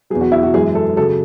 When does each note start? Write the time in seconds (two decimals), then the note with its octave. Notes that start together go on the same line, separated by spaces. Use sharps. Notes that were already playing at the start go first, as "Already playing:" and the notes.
0.10 E2 B2 F#3 G#4
0.21 F#4
0.32 E4
0.43 F#4
0.53 F#2 E3 G#3 G#4
0.75 A4
0.96 C#3 F#3 A4